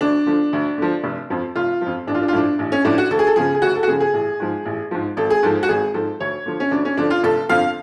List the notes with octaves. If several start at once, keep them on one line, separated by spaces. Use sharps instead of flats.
D2 D4
D3 F3
D2
D3 F3
F1
F2 F3
F1 F4
F3
F2
A1 D4
F4
D4
F4
A2 F3 D4
A1
C#4
A2 F3 D4
F#4
D2 A4
G#4
A4
C#3 F3 G#4
G#4
D2 F#4
A4
F#4
C#3 F3 G#4
G#4
A1
G#2 F3
A1
G#2 F3
G#1 A4
G#4
G#2 F3 A4
F#4
G#1 G#4
G#2 F3 A4
D2 C#5
D3 F3
C#4
D2 D4
C#4
D3 F3 D4
F4
F1 A4
F2 D3 F3 F5